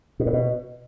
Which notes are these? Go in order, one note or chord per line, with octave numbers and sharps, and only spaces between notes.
B2
A2
B2